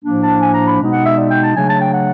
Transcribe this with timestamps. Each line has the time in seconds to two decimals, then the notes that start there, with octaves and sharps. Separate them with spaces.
0.04 A2 F3 A#3 D4
0.22 A5
0.41 G#5
0.54 A#5
0.67 B5
0.79 B2 G#3 B3 D#4
0.92 F#5
1.04 E5
1.17 D5
1.30 G5
1.42 A5
1.55 C#3 F#3 A3 D4 G#5
1.68 A5
1.80 G5
1.93 F#5